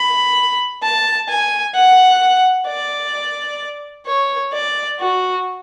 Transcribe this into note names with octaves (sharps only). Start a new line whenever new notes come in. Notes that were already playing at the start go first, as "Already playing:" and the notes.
Already playing: B5
A5
G#5
F#5
D5
C#5
D5
F#4